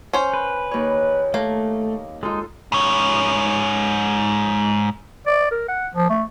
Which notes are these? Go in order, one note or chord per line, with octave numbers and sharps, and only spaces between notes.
C#4 C5
B4
D#2 C#5
A3 A#3
G#3 D#4 F4 A4
G#2 C#5
D5
A#4
F#5
F3
A3